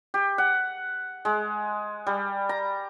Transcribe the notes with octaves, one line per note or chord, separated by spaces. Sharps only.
G4
F#5
G#3
G3
A#5